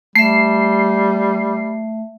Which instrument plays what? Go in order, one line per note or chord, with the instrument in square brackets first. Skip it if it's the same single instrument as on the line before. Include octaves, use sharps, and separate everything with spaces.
[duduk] G3 [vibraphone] A3 E5 [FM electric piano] C7